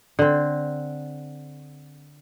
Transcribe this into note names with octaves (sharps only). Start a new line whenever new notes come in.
D3 C4